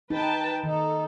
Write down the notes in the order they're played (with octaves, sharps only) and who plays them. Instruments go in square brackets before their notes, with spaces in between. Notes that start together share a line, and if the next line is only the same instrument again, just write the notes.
[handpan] D#4 [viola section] B4 G5 A5
[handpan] D#3 [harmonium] D#4 [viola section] A4